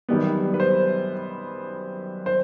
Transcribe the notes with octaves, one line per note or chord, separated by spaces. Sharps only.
F#2 D#3 G3 B3
B4
C5
C5